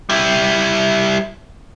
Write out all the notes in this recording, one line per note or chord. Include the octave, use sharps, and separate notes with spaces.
G3 E4